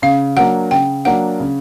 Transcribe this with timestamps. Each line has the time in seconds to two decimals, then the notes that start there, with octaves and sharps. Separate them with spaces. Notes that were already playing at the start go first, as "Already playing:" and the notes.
0.02 C#3 F5
0.36 F#3 A#3 D4 F#5
0.71 C#3 G5
1.05 F#3 A#3 D4 F#5
1.40 C#3